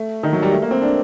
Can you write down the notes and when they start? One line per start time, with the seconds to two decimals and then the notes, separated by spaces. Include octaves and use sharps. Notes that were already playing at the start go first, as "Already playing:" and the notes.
Already playing: A3
0.23 D#3
0.33 F#3
0.42 G3
0.52 A3
0.62 A#3
0.71 C4
0.82 D4